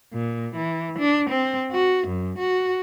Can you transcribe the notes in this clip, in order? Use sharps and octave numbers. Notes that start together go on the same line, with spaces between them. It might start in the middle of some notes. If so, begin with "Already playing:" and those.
A#2
E3
D4
C4
F#4
F#2
F#4